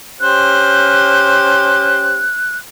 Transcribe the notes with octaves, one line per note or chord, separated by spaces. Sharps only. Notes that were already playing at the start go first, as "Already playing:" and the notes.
C#4 G4 C5 F#6